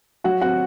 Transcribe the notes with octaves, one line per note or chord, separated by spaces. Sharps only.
F#3 F#4 F#5
C4 F#4 F#5